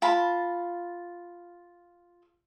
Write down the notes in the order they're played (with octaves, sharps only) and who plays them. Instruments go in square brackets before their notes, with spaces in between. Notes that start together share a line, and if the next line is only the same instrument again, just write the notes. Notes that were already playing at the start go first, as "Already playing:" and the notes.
[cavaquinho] F4 A5 B5